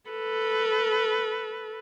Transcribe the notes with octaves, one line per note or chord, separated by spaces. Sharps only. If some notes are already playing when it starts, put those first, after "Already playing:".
A4 B4